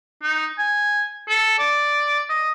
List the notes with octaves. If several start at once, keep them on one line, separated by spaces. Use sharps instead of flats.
D#4
G#5
A4
D5
D#5